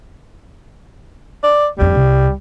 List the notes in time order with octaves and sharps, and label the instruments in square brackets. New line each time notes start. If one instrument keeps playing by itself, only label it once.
[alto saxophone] D5
[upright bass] D1 F2 [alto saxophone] G3
[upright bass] C2